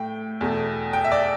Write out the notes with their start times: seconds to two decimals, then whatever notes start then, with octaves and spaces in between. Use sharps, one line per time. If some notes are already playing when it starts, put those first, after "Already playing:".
Already playing: A2 A3 G5
0.41 E2 B2 A3
0.93 G5
1.05 E5
1.12 D5